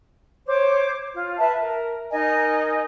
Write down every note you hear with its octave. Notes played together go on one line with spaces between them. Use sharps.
C5 C#5 D6
F4
B4 E5 A5
A#4
D#4 A#4 D#5 G#5